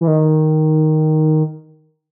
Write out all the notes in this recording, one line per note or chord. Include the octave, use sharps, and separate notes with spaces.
E3
D#3